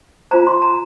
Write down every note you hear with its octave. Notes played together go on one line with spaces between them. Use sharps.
F4 C5 A#5
C6
A#5